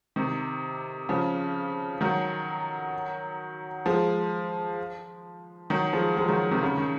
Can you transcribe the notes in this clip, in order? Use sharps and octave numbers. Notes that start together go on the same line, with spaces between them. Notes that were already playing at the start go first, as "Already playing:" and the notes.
C3 D#3
C#3 F3
D#3 F#3
F3 G#3
D#3 F#3
F3 G#3
F3 G#3
D#3 F#3
C3 D#3
C#3
D#3